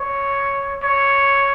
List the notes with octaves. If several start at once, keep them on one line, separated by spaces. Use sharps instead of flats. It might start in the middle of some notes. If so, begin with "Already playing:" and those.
Already playing: C#5
C#5